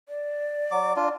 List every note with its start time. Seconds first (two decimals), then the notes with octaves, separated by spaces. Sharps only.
0.09 D5
0.71 F#3 D6
0.96 D4 F4